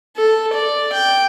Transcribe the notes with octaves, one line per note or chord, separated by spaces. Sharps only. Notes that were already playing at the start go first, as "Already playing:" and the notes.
A4
D5
G5